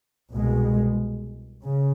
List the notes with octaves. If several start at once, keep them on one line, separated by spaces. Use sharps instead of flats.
C2 B2 G#3
C#3